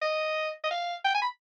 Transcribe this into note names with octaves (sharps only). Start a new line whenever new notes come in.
D#5
D#5
F5
G5
G#5
B5